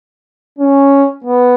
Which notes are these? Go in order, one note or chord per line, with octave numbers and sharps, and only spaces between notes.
C#4
B3